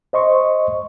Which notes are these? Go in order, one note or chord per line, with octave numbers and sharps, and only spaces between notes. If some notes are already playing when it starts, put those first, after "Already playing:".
C5 D#5 C6 C#6